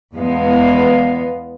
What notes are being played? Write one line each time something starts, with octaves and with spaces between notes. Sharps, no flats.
E2 G#3 B3 F5